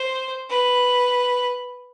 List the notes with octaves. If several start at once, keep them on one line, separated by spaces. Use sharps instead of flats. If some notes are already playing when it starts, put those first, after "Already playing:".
Already playing: C5
B4